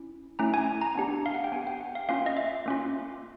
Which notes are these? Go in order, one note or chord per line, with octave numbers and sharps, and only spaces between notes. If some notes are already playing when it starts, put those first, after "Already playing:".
Already playing: C#4 E4
A3 C#4 E4 A#5
G#5
A#5
B3 D4 G4
F5
F#5
G5
B3 D4 G4 G#5
G5
F#5
F5
A#3 C#4 F4 F5
D#5
E5
A#3 C#4 F4